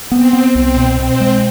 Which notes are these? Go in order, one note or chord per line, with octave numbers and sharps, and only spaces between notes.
B3 C4
B3
C2 C4
B2
B2 C4
G#3